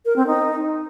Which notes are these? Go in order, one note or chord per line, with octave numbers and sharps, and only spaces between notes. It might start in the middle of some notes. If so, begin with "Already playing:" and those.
A#4
C4
D#4